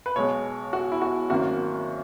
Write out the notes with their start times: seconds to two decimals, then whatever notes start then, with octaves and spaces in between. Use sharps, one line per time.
0.06 B4
0.16 B1 B2 G#3 C#5
0.73 F#4
0.92 E4
1.02 F#4
1.30 G#1 F#2 D#3 A#3 F#4